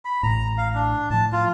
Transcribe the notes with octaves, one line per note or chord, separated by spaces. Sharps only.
B5
A1 A2 A#5
F5
D4
A2 F3 A5
F4